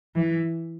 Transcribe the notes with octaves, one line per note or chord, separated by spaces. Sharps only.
E3